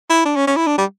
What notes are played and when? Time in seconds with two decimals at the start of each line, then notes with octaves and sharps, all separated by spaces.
0.10 E4
0.25 D4
0.36 C#4
0.47 C#4
0.56 E4
0.67 D4
0.78 G3